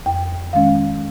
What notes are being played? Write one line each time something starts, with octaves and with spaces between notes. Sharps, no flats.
F2 G5
D#3 G#3 C#4 F5